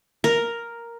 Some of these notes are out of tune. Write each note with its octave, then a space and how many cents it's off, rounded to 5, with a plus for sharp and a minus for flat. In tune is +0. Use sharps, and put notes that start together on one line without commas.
A#4 +0